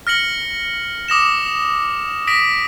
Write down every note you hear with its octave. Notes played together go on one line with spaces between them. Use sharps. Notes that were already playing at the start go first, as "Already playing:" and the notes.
F6 A#6 C#7 F#7
D6 D#6 A#6 E7
D#6 A#6 B6 D7